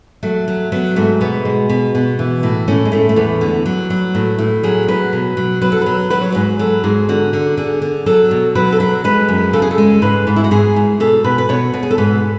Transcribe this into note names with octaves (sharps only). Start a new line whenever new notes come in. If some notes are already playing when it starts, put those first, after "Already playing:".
F#3 A3
F#3
F#3 B3
G#2 A3
B2 B3
G#3
B2
B2
E3
A2
A2 C#4
G#3
A2 A3
A3
E2 B3
D3
F#3
F#3
A2
A2
F#3 G#4
F#3 B4
B2
F#3
F#3 B4
A4
F#3 B4
F#3 B4
C#5
G#2 B4
F#3 A4
G#2 G#4
D3 F#4
D3
D3 G#4
D3
F#3 A4
B2
F#3 B4
A4
F#3 B4
G#3 B4
F#2
C#3 A4
G#4
A4
G#3
G#2 B4
G#2
E4
F#4
G#2 G#4
G#2
B2 A4
B2 B4
B4
B2 C#5
B2
G#4
A4
G#2 B4